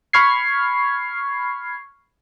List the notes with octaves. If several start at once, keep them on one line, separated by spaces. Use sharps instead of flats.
B5 C#6 F6 G#6 C7